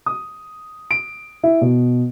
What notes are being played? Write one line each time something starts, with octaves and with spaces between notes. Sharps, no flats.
D#6
D7
E4
B2